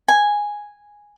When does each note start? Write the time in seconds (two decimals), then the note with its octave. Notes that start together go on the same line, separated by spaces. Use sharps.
0.08 G#5